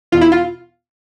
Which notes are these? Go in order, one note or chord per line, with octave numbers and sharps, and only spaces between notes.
E2 B2 F4
E4
F4